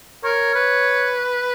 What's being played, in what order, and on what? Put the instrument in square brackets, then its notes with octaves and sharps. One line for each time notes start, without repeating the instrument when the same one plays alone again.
[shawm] A#4 [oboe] C#5
[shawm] B4